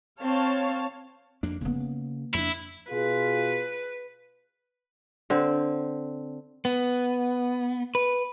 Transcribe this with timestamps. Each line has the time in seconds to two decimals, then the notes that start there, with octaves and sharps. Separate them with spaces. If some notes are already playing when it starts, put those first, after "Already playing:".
0.22 C4 C#5 F5 A5
1.43 F2 A#3 D4
1.61 C#3 A#3 B3
2.34 F2 D4 E4
2.90 B2 F4 G#4 B4
5.30 D3 C4
6.65 B3
7.95 B4